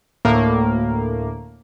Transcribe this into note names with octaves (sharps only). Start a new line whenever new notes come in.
D2 A2 A#3